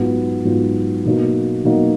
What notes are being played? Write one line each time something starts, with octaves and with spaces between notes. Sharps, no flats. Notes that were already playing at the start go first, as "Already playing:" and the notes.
Already playing: G#2 F#3 B3 F4
G#2 F#3 B3 F4
B2 F#3 A#3 D#4 F#4
B2 F#3 A#3 D#4 F#4